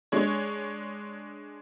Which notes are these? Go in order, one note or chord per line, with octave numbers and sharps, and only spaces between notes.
G#3 D4 C#5